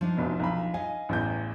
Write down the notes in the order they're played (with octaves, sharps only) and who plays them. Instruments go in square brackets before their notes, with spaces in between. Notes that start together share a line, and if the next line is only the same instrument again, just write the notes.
[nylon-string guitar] F3 D4 D#4
[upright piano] F1 A#1 B2
B1 B5
[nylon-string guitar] D#5 F5 [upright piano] G#5
[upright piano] A1 E2 G6